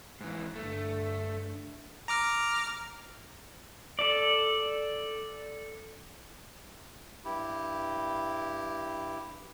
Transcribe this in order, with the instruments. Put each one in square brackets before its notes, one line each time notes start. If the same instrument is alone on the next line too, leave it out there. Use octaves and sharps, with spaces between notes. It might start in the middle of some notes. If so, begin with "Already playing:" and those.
[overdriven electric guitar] G#2 E3
[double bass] G2 D3 [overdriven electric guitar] A3
[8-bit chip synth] A#5 D6 F6
[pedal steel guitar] A4 D5
[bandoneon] G2 E4 G4